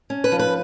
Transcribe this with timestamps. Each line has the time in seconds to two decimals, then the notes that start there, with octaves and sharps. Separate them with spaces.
0.10 C#4
0.24 B4
0.32 F3
0.39 B4